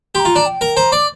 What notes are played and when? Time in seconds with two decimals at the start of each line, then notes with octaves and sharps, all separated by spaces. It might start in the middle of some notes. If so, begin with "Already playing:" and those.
0.15 G4 C6
0.20 A#5
0.25 F4
0.36 D4
0.46 G5
0.61 A#4
0.76 C5 A#5
0.92 D5 D6